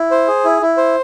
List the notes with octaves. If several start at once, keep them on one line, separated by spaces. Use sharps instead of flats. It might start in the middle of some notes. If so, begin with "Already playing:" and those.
Already playing: E4
C5
G#4
E4
E4
C5